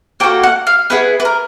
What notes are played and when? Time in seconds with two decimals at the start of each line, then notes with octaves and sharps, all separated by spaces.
0.20 A#3 D4 F#4 A4 G5
0.43 F#5
0.67 F5
0.90 B3 E4 G#4 B4
1.20 B4
1.25 A#4